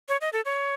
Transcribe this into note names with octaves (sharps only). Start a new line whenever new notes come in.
C#5
D#5
A4
C#5